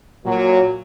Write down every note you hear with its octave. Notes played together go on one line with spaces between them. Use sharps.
A#2 F#3